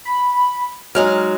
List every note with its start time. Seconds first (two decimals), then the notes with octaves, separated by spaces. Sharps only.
0.05 B5
0.95 F#3 G#3 D#4 F6